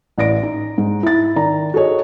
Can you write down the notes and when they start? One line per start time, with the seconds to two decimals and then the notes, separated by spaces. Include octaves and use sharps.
0.18 A1 D5 A#6 D7
0.43 D#4
0.78 G#2
1.03 E4 A6
1.36 D#3 D5 A#5
1.74 F#4 G#4 A4 C#5 D#5